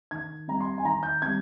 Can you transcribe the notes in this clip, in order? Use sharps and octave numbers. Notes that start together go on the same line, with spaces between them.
D#3 G#6
G3 C4 A#5
C6
G#5
D#3 A#5
G6
G3 C4 G#6